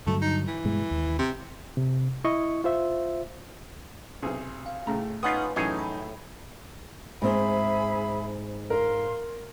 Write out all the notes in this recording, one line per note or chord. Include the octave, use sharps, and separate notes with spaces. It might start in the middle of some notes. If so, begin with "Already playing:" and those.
G2 D3 F#3 A3
D#4
E3
G2 B2 G#3
D#2
C3
C3
E4 D#5 C#6
F4 C5 E5
B1 C3 G#4
F5
A2 C#3 A3 A#5
B3 C#4 D#4 F4 B4 F#5 D#6
F#2 A2 E3 D#4 G#4 C#5
B5
G#2 C4 G#4 E5 B5
A#4 F5 C6